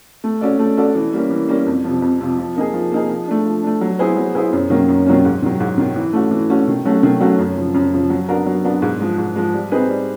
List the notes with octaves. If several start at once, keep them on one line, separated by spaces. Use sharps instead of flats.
A3
C#4 F#4 A4 D5
A3
C#4 F#4 A4 D5
E3
G3 A#3 C#4
E3
G3 A#3 C#4
F2
C3 F3
F2
C3 F3
F3
A#3 D#4 G#4
F3
A#3 D#4 G#4
F3
A3 D4
F3
A3 D4
F#3
B3 E4 G#4 C5
F#3
B3 E4 G#4 C5
F#2
D#3 F#3 A#3 C#4
F#2
D#3 F#3 A#3 C#4
G#2
D#3 F#3
G#2
D#3 F#3
E3
A3 C#4 F#4
E3
A3 C#4 F#4
D#3
F#3 A3 C#4 F#4
D#3
F#3 A3 C#4 F#4
F#2
C#3 F3
F#2
C#3 F3
F#3
B3 D4 F#4 A#4
F#3
B3 D4 F#4 A#4
G#2
F3 G#3
G#2
F3 G#3
G3
C4 D#4 G#4 B4
G3